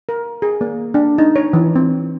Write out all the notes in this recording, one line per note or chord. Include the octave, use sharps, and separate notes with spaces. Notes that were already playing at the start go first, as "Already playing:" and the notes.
A#4
G#4
A#3
D4
D#4
C#5
E3
C4